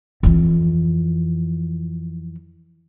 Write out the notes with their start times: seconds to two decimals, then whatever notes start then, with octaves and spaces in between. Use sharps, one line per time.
0.23 F2 E3